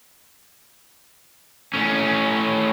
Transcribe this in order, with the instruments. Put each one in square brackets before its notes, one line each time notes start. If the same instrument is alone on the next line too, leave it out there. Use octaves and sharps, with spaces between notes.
[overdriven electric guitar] A2 C#4